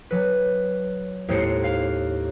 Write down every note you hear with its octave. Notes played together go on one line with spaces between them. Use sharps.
F#3 B4
D#2 A2 G#3 C5 C#7
F5